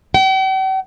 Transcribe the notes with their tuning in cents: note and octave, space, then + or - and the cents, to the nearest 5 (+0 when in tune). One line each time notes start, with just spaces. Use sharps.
G5 -45